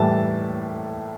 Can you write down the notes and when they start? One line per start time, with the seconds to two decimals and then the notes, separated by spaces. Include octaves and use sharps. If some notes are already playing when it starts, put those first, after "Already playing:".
Already playing: A2 E3 G3 A5 A6